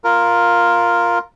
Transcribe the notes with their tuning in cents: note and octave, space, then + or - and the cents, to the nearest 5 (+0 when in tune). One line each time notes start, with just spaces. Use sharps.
F4 +0 A#4 +0